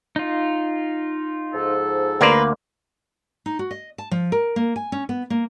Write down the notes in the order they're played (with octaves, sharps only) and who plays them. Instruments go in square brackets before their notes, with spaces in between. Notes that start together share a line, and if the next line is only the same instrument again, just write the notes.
[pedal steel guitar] D#4 F4
[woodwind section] G#2 F3 A4
[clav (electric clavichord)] D2 A#3 D5 [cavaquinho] A#4 B4 C6
[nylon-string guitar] D#4
F#4
D#5
A5
F3
A#4
A#3
G#5
C#4
B3
A#3